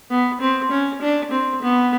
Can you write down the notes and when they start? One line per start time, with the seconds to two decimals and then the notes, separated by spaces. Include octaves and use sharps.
0.10 B3
0.41 C4
0.71 C#4
1.02 D4
1.32 C4
1.62 B3